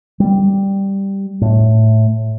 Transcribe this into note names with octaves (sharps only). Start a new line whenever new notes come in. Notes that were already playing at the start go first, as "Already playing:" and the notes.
G3
A2